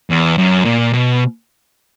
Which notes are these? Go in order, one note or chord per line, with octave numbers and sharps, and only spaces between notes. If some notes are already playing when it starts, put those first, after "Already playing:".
E2
F#2
A#2
B2